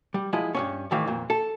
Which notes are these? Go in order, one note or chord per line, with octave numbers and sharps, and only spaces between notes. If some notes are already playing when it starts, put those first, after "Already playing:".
G3
F3 G#3 E4 D#5
G2 C3 C#4
A2 D#3 E3 F5
F2 A#2
A4